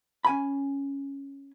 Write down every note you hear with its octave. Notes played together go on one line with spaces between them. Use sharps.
C#4 G#5 B5